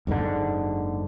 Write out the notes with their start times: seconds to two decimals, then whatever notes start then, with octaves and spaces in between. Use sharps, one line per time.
0.07 F#1 G#2 B2 D3